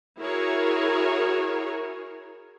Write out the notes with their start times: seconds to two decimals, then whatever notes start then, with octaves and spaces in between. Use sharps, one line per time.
0.18 E4 F#4 G#4 A#4 C#5